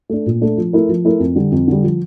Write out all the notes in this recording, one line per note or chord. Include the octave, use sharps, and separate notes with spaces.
A3 D4
A#2
A3 D4
F3
A3 E4 A#4
F3
A3 E4 A#4
F2
D3 G3
F2
D3 G3
F3